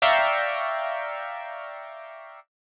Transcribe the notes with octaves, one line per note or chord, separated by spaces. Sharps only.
D5 E5 F5 G5 A#5 C#6